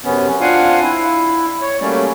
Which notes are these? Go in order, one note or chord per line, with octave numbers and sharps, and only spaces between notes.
F#2 C3 B3 C#4
C4 D4 F4 F5 F#5 G#5
E4
C#5
F#3 G3 A3 A#3 C#4 D5